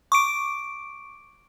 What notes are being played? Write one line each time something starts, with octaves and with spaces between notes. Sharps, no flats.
C#6 D6 D7